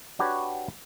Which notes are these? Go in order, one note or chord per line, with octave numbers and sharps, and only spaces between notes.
D4 F#4 G4 B4 C#5